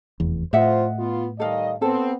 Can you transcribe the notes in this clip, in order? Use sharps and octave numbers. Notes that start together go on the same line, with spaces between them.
F1 E2
F2 A2 F4 C5 D#5 E5 F#5
B3 F4
D#3 G3 A4 D#5 F5
B3 C4 A4